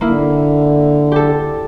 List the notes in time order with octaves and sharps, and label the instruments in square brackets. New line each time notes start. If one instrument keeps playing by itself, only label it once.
[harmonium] D3 [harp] A#3 E4
[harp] G4 A4